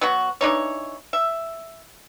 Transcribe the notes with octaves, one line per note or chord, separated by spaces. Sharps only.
F#3 B3 F#4
E3 D4 D#4 C#5
E5